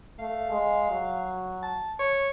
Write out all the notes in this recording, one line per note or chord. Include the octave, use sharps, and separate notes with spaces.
A3 F5
G#3
F#3
A5
C#5